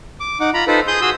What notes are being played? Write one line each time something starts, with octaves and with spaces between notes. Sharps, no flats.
D6
D#4 F#5 D6
F4 A#5 B5
D#4 F4 A4 B4 C5
G#4 C6 D#6 G6
F#4 G#4 C6 D#6 E6